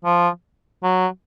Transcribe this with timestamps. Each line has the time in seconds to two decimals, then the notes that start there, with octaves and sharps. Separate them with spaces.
0.04 F3
0.83 F#3